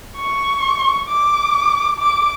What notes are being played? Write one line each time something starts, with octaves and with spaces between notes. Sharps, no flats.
C#6
D6
D6